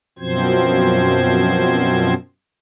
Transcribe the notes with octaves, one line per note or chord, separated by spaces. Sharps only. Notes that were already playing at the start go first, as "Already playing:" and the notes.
F#2 B2 F3 C4 C5 G#6